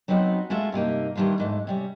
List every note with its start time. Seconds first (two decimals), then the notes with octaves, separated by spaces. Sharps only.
0.08 F#3 B3 C4 D#4 F#4
0.50 G#3 A3 F4 F#4 E5
0.72 G2 C3 A#3 D#4
1.15 D#3 E3 G3 D4 F4
1.38 E2 G#2 A3
1.67 C3 G3 C#4